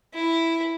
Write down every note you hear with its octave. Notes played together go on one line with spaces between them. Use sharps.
E4